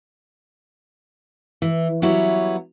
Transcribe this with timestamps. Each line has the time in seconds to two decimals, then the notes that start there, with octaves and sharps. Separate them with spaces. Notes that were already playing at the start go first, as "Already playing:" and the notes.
1.62 E3
2.02 F#3 G3 B3 E4 C#5